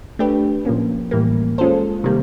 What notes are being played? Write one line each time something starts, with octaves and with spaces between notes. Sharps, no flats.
A3 D4 G4 B4
A#2 F3 A#3 C#4
A2 E3 G3 A#3
G#3 C#4 F4 A4 C5
C3 D#3 G3 A#3